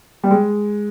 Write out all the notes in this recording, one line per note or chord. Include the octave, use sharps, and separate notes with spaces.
G3
G#3